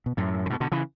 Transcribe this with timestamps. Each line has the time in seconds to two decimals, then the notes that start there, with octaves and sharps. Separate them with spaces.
0.06 B2
0.17 F#2 A2
0.46 C#3
0.50 G2 B2
0.60 B2 D3
0.72 C#3 E3